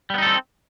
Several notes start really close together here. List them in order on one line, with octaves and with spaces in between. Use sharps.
G3 B3 D#4 A4 C4